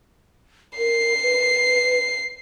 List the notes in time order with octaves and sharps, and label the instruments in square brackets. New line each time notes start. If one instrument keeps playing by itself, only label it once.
[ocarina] A#4 [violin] C7
[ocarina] B4